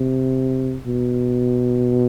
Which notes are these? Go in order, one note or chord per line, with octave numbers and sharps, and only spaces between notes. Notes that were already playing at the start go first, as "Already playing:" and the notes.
Already playing: C3
B2